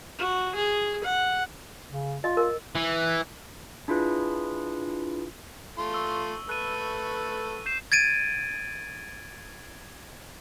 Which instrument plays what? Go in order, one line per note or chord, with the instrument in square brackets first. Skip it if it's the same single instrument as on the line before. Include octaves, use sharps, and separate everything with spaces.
[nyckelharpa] F#4
G#4
F#5
[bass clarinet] C#3
[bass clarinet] F4 [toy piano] D#5
[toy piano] A#4
[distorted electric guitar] E3
[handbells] D4 E4 F4 G#4 B4
[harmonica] A3 F4 C6
[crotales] C#6 E6 G7
[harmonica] A3 A4 B4 [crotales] F#6 D#7
[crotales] G6 C7 E7
[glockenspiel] G#6 A6 D7 D#7